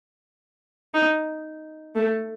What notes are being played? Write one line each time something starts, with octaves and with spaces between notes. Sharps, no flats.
D#4
A3